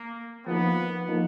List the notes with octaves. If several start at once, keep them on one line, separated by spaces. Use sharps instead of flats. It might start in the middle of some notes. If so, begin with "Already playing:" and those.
Already playing: A#3
F3 A#3 B3 D#4
F3 A#3 D#4